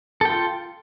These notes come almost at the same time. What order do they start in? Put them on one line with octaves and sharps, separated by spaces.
A4 G5 F4